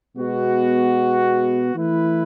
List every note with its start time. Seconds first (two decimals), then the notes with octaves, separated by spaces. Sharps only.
0.16 B2 G#3 B3 F#4
1.73 E3 A3 E4 B4